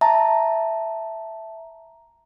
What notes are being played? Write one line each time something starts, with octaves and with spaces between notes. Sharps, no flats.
E5 A5 A#5